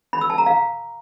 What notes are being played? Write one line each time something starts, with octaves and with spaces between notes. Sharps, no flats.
B5
E6
A5
A#5
F5